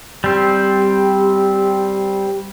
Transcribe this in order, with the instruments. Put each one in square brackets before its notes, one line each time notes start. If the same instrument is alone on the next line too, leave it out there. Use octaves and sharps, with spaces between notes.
[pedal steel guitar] G3 C4 [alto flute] G4